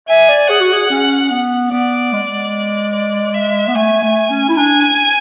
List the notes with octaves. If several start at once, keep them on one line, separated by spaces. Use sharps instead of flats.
E5 G#5
D5
G#4 F#5
F#4
G#4
C#4
B3
B3 D5
G#3
G#3
D5
E5
B3
A3 G#5
A3
C#4
E4
D4 G#5